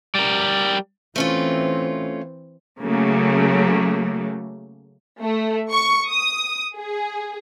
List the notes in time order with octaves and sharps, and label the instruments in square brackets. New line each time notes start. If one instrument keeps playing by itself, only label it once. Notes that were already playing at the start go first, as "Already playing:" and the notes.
[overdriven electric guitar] G3 A#4
[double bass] E3 C4 [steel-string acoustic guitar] A3 C#4 F4
[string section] C#3 F#3 A3 A#3
[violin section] A3
C#6
D#6
G#4